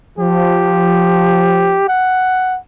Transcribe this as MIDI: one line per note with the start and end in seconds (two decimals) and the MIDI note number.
0.19 1.79 53
0.19 1.86 67
1.88 2.59 78